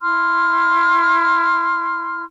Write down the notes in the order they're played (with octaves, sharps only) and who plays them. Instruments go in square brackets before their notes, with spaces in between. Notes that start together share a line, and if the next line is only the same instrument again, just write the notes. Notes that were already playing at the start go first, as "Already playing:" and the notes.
[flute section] E4 C6 F6